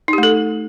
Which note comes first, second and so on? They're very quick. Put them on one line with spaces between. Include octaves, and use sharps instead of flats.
D#4 G4 A3 A4